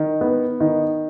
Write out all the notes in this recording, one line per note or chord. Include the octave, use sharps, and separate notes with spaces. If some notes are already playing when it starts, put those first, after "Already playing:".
Already playing: D#3
B3
D#3